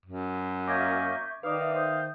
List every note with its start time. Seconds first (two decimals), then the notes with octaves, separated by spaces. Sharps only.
0.05 F#2
0.68 A#3 C#4 D#5 E5 C#6 D6 G6 G#6
1.43 D#3 D#4 B4 D5 F5 D6 D#6
1.61 E5
1.74 C5 D#6 G6